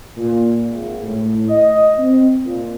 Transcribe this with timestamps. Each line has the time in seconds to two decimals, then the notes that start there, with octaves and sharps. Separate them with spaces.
0.16 A#2
0.68 G#1
1.02 A2
1.48 D#5
1.97 C4
2.45 A#2